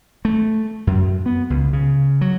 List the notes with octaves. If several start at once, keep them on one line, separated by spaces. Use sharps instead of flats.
A3
F#2
B3
C#2
C#3
F#3